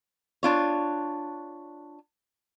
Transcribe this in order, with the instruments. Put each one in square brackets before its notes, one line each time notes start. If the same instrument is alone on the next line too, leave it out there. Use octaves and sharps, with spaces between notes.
[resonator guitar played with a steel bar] D4 F4 C#5